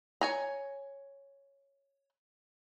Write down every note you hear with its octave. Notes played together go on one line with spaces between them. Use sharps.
C#5 G#5 A#5